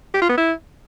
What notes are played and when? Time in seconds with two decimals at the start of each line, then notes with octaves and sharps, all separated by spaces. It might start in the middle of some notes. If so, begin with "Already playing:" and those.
0.14 G4
0.22 F4
0.29 B3
0.37 E4